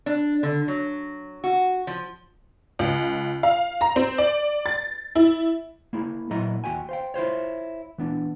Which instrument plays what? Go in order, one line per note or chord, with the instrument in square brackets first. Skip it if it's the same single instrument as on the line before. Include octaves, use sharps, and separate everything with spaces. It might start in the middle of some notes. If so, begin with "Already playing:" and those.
[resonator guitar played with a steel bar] D4
D3
F#3
F#4
F3
[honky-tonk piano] C#2
F5
A#5
C4
D5
A6
E4
[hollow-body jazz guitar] A#3 E4 G#4
A#2 F#3 A#3 E4 D#5 A#5
D#2 F#4 G5 G#5
C5 F5 G5
E4 F4 C5 C#5
E3 B3 D4